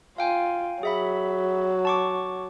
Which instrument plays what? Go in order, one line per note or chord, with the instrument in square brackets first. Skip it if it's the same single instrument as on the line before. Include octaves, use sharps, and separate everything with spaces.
[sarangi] F4 [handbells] F5 G5 G#5
[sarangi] F#3 [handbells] G#4 E5 B5
[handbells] A5 C#6 D6